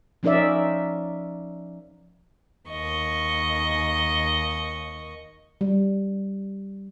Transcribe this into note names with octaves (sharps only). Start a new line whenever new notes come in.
F3 C#4 D#4 A#4 D5 E5
D#2 D#5 C#6
G3